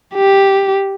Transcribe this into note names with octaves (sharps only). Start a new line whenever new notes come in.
G4